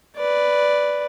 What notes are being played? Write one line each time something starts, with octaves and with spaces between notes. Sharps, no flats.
B4 D5